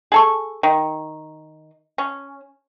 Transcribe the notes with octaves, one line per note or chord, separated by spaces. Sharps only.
G#4 A4 C#6
D#3
C#4